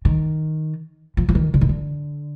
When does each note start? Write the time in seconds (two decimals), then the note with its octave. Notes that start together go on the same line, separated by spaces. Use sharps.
0.05 D#3
1.17 F3
1.29 F3
1.35 D#3
1.54 D3
1.61 D#3
1.69 D3